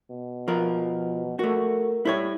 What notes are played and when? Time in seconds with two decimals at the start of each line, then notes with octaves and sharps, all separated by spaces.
0.11 B2
0.48 F3 A#4
1.39 A3 F#4 A#4
2.05 G3 E4 C5 C#5